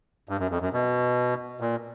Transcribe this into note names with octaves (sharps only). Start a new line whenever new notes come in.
G2
F#2
F2
F#2
B2
A#2